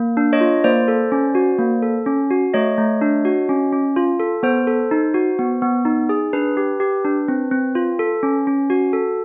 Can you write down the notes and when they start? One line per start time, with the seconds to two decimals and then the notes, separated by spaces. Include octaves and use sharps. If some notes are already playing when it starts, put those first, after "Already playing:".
Already playing: A#3
0.17 D4
0.33 C#5 D#5
0.41 F4
0.64 A#3 C5 D5
0.88 A4
1.12 C#4
1.35 F#4
1.59 A#3
1.83 A4
2.06 C#4
2.31 F#4
2.54 A3 C#5 D#5
2.78 A3
3.02 D4
3.25 F#4
3.49 C#4
3.72 C#4
3.96 F4
4.19 A4
4.43 B3 C5
4.67 A4
4.91 D#4
5.14 F#4
5.39 B3
5.62 B3
5.85 D#4
6.09 G#4
6.33 D4 B4
6.57 G4
6.80 G4
7.04 D4
7.28 C4
7.51 C4
7.75 F4
7.99 A4
8.23 C#4
8.47 C#4
8.70 F#4
8.93 A4